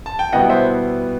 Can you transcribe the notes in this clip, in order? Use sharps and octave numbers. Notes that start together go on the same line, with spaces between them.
A5
G5
B2 G3 B3 E4 D#5 F#5
C5 E5